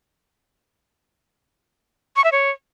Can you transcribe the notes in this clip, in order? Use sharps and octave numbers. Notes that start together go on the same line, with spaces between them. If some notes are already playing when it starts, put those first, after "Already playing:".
C#6
E5
C#5